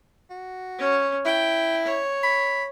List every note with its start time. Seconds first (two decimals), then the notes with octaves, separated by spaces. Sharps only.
0.30 F#4
0.79 C#4 C#5
1.25 E4 G5
1.85 C#5
2.24 B5